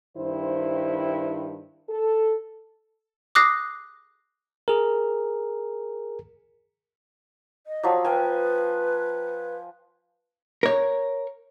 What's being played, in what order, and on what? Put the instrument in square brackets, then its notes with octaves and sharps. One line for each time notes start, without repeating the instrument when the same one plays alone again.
[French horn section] G2 D#3 E4 C5
A4
[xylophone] D6 D#6 F#6 A#6 C7
[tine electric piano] G#4 A#4
[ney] D#5
[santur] F3 F#3
[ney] B4 [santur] F5 G5 G#5
[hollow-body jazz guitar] A#4 C#5